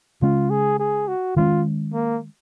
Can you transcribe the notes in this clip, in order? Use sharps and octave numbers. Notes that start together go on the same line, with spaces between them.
C#3 G#3 C#4 F4
G#4
G#4
F#4
D#3 G#3 C#4 F4
A#3